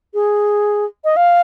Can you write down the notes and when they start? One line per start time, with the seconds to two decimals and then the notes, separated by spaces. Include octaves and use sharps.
0.14 G#4
1.04 D#5
1.16 F5